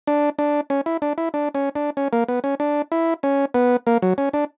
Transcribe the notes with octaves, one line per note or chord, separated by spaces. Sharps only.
D4
D4
C#4
E4
D4
E4
D4
C#4
D4
C#4
A#3
B3
C#4
D4
E4
C#4
B3
A#3
F#3
C#4
D4